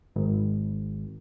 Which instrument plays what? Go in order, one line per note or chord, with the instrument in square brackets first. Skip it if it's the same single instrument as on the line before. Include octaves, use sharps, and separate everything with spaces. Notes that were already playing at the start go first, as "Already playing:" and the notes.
[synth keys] G#1